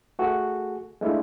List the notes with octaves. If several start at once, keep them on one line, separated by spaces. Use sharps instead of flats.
A3 F#4 G#4 A4
G#3 A3 D4 E4 F4